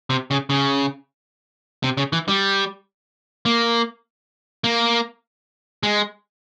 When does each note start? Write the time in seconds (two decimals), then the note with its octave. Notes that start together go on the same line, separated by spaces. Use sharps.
0.10 C3
0.31 C#3
0.50 C#3
1.84 C3
1.97 C#3
2.13 E3
2.28 G3
3.46 A#3
4.64 A#3
5.83 G#3